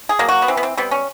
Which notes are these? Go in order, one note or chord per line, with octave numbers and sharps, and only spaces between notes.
G#4
F#3 A#3
F#4
B3
E3 C4
B3
C4
G3 B3 C4
C#4